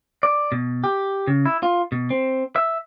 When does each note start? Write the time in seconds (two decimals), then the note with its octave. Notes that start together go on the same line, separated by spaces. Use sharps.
0.23 D5
0.52 B2
0.84 G4
1.27 C#3
1.46 E4
1.63 F4
1.92 B2
2.10 C4
2.56 E5